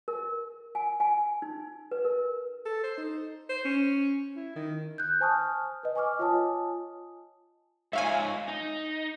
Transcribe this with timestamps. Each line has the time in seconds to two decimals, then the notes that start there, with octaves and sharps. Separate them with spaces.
0.08 A#4
0.75 G#5
1.00 G#5
1.42 D#4
1.91 B4
2.05 A#4
2.66 A4
2.84 C5
2.98 D#4
3.50 C5
3.65 C#4
4.36 E4
4.56 D#3
4.98 F#6 G6
5.20 C5 G#5 A5 C#6 D#6 F6
5.83 B4 D#5
5.96 G#5 C#6 D6 F6
6.19 F4 C#5 D#5 G#5 A5 D#6
7.93 G#2 D#4 C#5 E5 F5 G#5
8.48 D#4